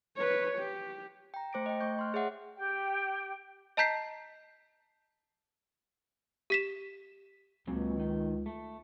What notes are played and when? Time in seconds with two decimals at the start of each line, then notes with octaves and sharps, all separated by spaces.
0.16 B4 C#5
0.59 G4
1.34 G5 A#5
1.53 A3 C5 D6 A#6 D7
1.66 D#5 G5
1.81 A3 D#5 C#6 G6
1.99 C6 F6 F#6
2.14 G#4 C#5 E5 F#5
2.57 G4 G5
3.77 D#5 A5 A#5 G6 B6 C7
6.50 G4 B6 E7
7.67 C#2 A#2 F#3 C4
7.96 D#3 D#4
8.46 A3